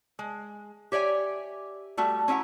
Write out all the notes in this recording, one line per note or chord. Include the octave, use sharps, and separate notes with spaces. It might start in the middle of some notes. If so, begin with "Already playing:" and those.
G#3
G4 C#5 D5 E5 G#5
G3 A3 F#4
C#4 D4 E4 F#5 A#5